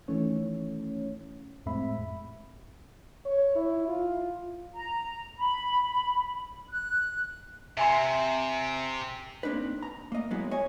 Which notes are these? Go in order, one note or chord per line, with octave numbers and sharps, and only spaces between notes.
D#3 E3 A3 C#4 C#5
F2 A2 G#3 C4 E5 B5
C#5
E4
F4
A#5
B5
F#6
C3 E5 G#5 C6
A#3 C4 D4 D#4 B4
A#5
A#3 D#5
F#3 G#3 A#3 B3 E4
C#5 D#5 G#5